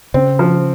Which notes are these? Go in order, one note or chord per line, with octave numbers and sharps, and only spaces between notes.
C#3 C4
F3